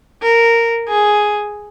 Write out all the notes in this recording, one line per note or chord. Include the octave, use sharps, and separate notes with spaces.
A#4
G#4